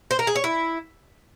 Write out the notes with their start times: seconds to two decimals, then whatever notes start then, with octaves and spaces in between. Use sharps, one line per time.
0.11 C5
0.19 A#4
0.27 G#4
0.35 C#5
0.44 E4